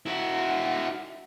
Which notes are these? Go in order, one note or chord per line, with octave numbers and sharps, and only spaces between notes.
E4 F#4